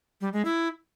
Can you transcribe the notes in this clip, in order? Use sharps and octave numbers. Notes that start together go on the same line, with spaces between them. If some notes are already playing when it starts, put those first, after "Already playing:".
G3
G#3
E4